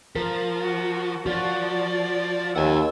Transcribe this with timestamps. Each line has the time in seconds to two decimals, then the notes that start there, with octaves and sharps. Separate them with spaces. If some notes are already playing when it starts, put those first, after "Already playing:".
0.16 F3 A#4
0.61 F#4
1.26 F3 F#4 D5
2.56 D#2 F#5 G#5 E6